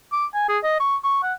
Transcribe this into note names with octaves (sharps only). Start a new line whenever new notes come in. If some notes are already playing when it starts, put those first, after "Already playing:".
D6
G#5
G#4
D#5
C#6
C#6
F#5